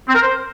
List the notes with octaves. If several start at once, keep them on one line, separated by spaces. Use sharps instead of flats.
C4
A#4
C5